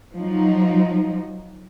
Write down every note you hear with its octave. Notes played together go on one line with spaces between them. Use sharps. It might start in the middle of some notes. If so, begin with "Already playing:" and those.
F3 F#3 D#4